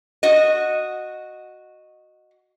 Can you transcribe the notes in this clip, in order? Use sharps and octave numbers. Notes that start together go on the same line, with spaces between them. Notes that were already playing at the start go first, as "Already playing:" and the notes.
F#4 D#5